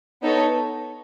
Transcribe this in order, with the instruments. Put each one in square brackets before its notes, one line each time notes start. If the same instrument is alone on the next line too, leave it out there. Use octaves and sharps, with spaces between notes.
[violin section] B3 D#4 A4 C#5